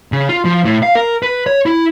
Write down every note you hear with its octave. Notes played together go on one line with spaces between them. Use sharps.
C#3
F4
F3
A2
F5
A#4
B4
C#5
E4